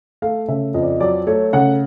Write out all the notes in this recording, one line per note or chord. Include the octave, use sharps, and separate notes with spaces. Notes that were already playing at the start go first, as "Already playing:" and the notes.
A3 F5
C#3 E5
F2 D#5
D5
D#5
F#3 D5
A3 C#5
C#3 F#5